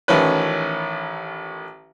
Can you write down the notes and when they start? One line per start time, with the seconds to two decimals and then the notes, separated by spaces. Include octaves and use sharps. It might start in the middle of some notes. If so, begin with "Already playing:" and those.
0.08 A1 D#3 F3 C#4 B4